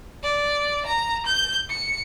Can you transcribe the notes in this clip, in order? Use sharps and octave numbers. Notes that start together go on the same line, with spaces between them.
D5
A#5
G6
C#7